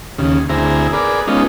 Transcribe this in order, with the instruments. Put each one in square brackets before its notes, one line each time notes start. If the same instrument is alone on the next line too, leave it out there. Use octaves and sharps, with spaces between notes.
[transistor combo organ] D#2 C#3
D2 C4 E4 G#4 A#5
G#4 A#4 B4 D5
G#3 B3 C#4 D#4 F4